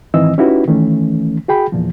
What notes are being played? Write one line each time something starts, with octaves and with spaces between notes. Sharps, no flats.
G#2 D#3 E3 C4 D#5 E6
C#4 D#4 E4 F#4 G4 B4
D#3 E3 A3 C#4
F#4 G#4 G5 B5
E2 A#2 F3